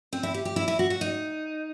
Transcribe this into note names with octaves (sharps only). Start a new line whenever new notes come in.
C4
E4
G4
G4
E4
E4
F#4
F#4
D#4